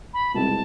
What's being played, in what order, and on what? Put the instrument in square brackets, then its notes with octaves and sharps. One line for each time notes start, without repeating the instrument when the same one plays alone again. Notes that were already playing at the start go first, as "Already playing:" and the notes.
[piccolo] B5
[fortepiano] C2 B2 G#3 C4 E4 [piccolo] A5